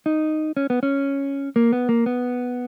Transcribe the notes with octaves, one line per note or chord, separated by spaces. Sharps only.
D#4
C#4
B3
C#4
A#3
B3
A#3
B3